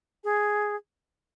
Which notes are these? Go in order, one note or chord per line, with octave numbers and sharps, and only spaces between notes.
G#4